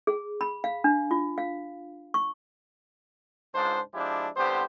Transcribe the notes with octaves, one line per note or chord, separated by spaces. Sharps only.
G#4
B5
F5
D4
F4
F5
C#6
C#2 G#2 G#3 D4 F4 C5
F3 G#3 D4 E4 G4
C2 D3 B3 G4 C5